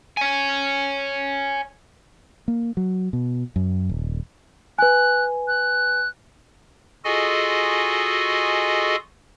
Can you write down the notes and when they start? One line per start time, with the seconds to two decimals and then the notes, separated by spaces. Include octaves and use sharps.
0.17 C#5 G#5
2.48 A#3
2.77 F#3
3.13 B2
3.56 F#2
3.89 D#1
4.79 B4 G#5 F#6
5.48 F#6
7.04 F4 F#4 G#4 A4 D#5 G#5